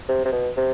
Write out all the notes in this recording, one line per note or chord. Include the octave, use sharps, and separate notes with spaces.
C3
C3
B2
C3